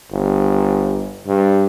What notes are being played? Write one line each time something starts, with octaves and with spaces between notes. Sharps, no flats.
G1
G2